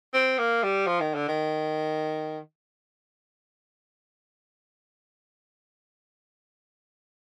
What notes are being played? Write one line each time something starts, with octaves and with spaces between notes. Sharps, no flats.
C4
A#3
G3
F3
D#3
D3
D#3